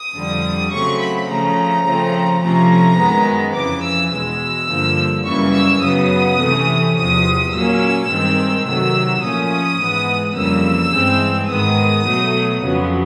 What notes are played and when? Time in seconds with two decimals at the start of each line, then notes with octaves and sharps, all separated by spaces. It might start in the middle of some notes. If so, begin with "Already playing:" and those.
Already playing: D#6
0.16 F2 D3 G3
0.72 C#3 F#3 A3 C4 C#6
1.01 B5
1.29 C#3 F3 A3 A#5
1.85 C#3 F3 A3 C4
2.43 C3 F3 A3 C#4 A#5
2.99 F#2 D#3 G#3 B3
3.56 F2 C#3 E3 D6
3.84 E6
4.12 E2 B2 G#3 E6
4.69 G2 D3 F3 A#3
5.26 F#2 C#3 E3 G3 A#3 C#6
5.55 E6
5.82 F#2 C#3 F#3 B3 D#6
6.40 C3 E3 A3 C#4
6.96 E2 C3 F3 D#6
7.52 A#2 F#3 A#3 C#4 E6
8.09 G2 D#3 G#3 C4
8.66 C3 D#3 F#3 A3 E6
9.22 A#2 F3 A3 C#4 D#6
9.80 G#2 E3 G#3 B3
10.36 F2 C#3 E3 G3 A#3 E6
10.93 G2 E3 G#3 C4
11.49 G#2 D#3 G#3 B3 D#6
12.06 B2 F#3 A3
12.63 F2 C#3 F#3 B3